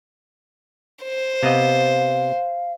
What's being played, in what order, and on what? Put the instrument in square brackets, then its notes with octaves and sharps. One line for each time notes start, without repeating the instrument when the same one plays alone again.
[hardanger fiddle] C5
[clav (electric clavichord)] C3 B3 D#5 [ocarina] F5